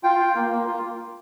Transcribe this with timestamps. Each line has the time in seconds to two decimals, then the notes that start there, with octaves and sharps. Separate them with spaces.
0.03 F4 G5
0.20 F4
0.35 A#3
0.50 A#3
0.67 F4